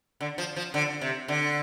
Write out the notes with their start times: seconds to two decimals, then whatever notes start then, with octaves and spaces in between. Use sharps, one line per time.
0.21 D3
0.38 F3
0.56 F3
0.74 D3
1.01 C3
1.28 D3